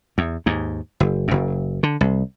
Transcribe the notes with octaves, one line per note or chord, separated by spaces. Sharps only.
E2
D#2 G#2
F#1
F#1 F#2
D3
C2